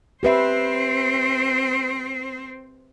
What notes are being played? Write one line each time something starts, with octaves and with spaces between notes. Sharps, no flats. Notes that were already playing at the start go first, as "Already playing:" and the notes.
C4 G4 B4 C5 E5